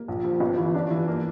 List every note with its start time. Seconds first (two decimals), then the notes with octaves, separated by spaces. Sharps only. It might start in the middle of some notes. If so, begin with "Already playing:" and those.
Already playing: A#3
0.08 A#1
0.24 F3
0.40 G1
0.58 E3
0.74 D4
0.91 E3
1.08 A#3